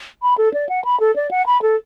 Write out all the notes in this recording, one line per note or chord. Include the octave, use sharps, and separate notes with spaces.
B5
A4
D5
F#5
B5
A4
D5
F#5
B5
A4